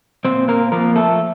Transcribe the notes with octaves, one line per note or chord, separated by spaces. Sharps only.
A#2 C4 C5
A#3 A#4
F3 A#3 A#4
A3 A4